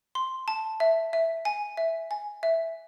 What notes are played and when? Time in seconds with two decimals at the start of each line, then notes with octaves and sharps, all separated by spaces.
0.15 C6
0.48 A5
0.80 E5
1.13 E5
1.45 G#5
1.77 E5
2.11 G#5
2.43 E5